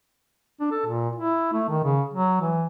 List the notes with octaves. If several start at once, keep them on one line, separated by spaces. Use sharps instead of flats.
D4
A4
A#2
E4
A3
D#3
C#3
F#3
E3